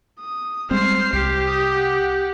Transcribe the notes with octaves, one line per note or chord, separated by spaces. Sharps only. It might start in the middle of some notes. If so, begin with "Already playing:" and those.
D#6
G3 G#3 C4 C5 F6 C7
C2 G4
D6 D#6
F#5